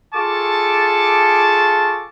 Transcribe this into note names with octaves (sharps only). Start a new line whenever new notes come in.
F4 G#4 A4 A5 C#6 D6